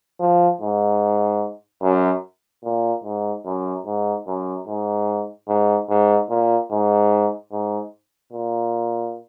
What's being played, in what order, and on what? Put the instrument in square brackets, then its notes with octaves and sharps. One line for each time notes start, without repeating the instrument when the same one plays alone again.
[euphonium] F3
G#2
F#2
A#2
G#2
F#2
G#2
F#2
G#2
G#2
G#2
A#2
G#2
G#2
A#2